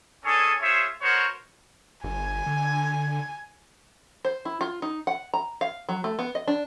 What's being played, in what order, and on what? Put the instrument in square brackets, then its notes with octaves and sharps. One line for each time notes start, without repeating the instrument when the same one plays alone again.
[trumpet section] C#4 D4 G#4 A4 C#5 G#5
F4 G#4 C5 C#5 E5
B3 F#4 A#4 C5 C#5
[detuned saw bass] G1 [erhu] G#5
[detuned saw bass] D3
[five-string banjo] C5
E4
F4
D#4
F#5
A#5
F5
F#3
A3
B3
D#5
D4